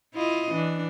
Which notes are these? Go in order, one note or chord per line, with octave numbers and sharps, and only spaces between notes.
E4 F4 D#5
E3 D4